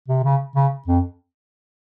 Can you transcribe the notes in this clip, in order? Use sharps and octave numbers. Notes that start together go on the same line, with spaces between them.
C3
C#3
C#3
F2